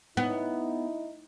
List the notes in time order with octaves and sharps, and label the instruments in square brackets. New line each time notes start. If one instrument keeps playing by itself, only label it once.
[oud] B3 [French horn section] D#4 E4